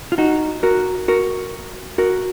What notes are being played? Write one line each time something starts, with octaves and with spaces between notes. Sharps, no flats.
F4
D#4 F#4
F#4 A#4
F#4 A#4
F#4 A#4